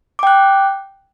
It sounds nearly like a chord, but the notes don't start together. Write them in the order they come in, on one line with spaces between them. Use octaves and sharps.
D6 G5 F#6